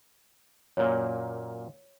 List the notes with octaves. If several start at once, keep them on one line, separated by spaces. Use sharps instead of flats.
F#2 A#2 A#3 C#5